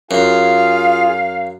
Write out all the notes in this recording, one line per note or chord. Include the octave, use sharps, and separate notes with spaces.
F#2 F4 G#4 F5